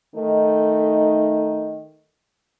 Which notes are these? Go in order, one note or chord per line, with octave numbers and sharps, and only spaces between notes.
D#3 A3 D#4